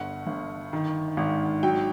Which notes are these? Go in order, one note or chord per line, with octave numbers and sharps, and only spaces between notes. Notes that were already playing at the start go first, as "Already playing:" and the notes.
Already playing: G1 G2 F#5
G1
D#3
G#1
F#3 G5